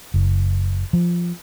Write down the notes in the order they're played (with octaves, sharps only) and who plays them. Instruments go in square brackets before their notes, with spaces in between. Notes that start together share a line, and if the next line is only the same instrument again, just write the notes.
[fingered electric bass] F#1
F3